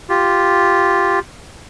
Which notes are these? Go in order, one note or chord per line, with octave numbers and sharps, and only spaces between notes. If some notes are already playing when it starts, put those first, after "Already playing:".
F4 G4